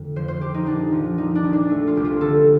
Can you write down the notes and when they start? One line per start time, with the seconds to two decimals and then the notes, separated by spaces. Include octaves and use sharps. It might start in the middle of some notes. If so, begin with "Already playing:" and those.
Already playing: F2 D3 A3
0.16 F3 C5
0.28 C5
0.41 F3 G4
0.54 D#4
0.66 A#1 D4
0.92 F3
1.18 G3 D#4
1.35 D4
1.44 A#1
1.53 D4
1.70 A3
1.87 F4
1.96 C2 G4
2.05 F4
2.21 D3 A4